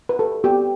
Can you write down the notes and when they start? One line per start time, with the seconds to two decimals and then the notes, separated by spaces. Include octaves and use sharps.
0.09 B4
0.19 G4 A4
0.44 B3 G4